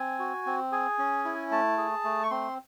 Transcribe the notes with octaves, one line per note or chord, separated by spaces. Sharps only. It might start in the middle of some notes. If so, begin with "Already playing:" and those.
Already playing: C4 G#5
F#4
C4
G#4 G#5
C#4
E4
A3 A5
G#4
A3
C#6
C4 C6